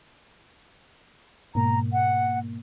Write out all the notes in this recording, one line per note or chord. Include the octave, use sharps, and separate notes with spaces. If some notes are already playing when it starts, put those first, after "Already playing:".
G#2 B2 A#3 A#5
F#5